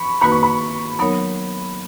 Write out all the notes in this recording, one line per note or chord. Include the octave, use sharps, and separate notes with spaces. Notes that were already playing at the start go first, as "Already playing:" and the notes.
Already playing: B5 C#6
D#3 A#3 D#4 F#4 B4 B5
C#6
B5
F#3 B3 D#4 A#4 C#5 B5